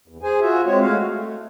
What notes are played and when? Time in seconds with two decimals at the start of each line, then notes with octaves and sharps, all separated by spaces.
0.08 E2
0.23 G#4 C5 G#5
0.41 F4 F#4 E5
0.66 G#3 C4 C#5
0.81 G#3 A3 F#4 F5
1.06 A3